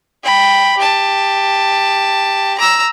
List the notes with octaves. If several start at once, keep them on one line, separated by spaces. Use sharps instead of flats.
G5 B5
G4 A5
A#5 E6